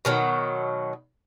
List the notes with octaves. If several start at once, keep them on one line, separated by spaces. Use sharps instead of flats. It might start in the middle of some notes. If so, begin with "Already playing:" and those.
B2 D#3 F#3